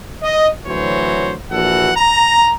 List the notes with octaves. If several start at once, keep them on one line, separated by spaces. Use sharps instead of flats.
D#5
D2 E3 F#3 C5 C#5
A#1 E3 F#4 A4 F#5
A#5